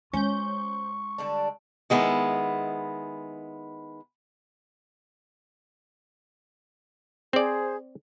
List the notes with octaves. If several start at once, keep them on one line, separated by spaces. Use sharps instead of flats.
G#3 C#4 F4 C5 C#6 G6
D3 G3 D4
D#3 G#3 B3 E4
C4 G#4 C5 D5